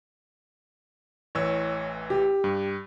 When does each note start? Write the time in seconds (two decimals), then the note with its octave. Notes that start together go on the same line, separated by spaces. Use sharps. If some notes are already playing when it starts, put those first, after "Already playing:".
1.35 A1 E3 C#5 E6
2.10 G4
2.44 G2